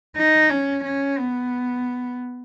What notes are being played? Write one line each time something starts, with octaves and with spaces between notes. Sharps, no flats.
D#4
C#4
C#4
B3